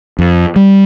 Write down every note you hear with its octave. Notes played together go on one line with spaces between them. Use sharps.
F2
G3